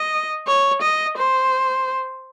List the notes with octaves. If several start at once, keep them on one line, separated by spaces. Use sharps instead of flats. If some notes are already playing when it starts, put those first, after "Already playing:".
Already playing: D#5
C#5
D#5
C5